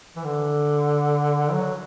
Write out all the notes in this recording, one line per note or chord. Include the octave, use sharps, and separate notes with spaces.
E3
D3
F#3